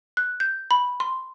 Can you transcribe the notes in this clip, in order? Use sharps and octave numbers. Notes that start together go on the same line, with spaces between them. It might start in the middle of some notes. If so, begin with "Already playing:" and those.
F#6
G6
B5
C6